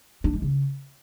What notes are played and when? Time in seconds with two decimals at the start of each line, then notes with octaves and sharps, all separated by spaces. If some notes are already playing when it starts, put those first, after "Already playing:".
0.24 D4
0.33 G#3
0.42 C#3